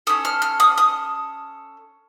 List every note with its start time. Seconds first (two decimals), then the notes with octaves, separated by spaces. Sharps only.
0.07 C#4 F#4 A4 D#6
0.25 F6
0.42 F6
0.60 D#6
0.78 D#6